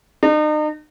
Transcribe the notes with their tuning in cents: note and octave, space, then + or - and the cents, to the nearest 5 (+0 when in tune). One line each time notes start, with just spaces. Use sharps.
D#4 -40